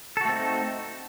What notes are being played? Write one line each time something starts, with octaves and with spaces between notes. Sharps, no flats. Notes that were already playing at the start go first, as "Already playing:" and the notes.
A3 C4 D#4 F#4 A4